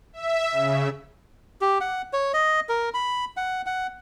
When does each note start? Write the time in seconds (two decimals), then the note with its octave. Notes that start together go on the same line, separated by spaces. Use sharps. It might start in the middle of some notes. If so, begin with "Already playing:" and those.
0.13 E5
0.51 C#3
1.61 G4
1.81 F#5
2.13 C#5
2.34 D#5
2.69 A#4
2.94 B5
3.37 F#5
3.66 F#5